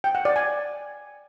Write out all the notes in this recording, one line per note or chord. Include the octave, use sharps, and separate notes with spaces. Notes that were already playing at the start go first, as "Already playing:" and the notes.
G5
F#5
D5
G#5